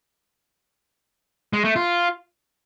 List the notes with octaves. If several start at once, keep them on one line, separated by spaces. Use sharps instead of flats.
G#3
A3
F4